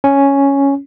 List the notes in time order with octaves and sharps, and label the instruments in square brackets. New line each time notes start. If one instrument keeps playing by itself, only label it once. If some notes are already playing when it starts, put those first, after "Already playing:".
[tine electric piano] C#4